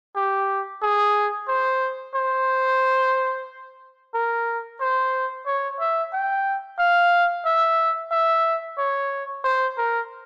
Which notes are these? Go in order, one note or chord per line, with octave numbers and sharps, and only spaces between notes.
G4
G#4
C5
C5
A#4
C5
C#5
E5
G5
F5
E5
E5
C#5
C5
A#4